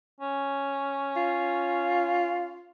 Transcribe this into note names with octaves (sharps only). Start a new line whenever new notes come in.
C#4
F4